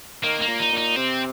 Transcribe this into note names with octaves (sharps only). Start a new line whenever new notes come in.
D#3 A#3
A#3
A#2
D#4
A#2
D#4
C3 C4